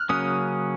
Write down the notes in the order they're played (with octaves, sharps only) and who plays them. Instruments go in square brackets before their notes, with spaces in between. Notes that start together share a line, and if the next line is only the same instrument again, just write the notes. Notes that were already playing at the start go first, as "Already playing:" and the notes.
Already playing: [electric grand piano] F6 F#6
[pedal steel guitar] C#3 F#3 A#3 C#4 [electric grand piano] D#6